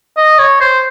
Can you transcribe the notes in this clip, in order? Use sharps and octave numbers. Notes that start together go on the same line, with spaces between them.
D#5
C#5
C5